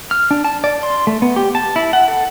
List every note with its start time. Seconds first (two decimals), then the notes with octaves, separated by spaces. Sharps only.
0.11 F6
0.31 D4
0.45 A5
0.64 D5
0.83 C6
1.07 A3
1.22 B3
1.36 G4
1.55 A5
1.76 E4
1.93 F#5
2.08 A4